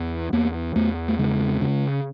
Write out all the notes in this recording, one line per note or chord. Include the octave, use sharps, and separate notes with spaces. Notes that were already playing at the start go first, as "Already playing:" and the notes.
Already playing: E2
E2 A#3
E2 A3
A3
C#3 G#3
C#3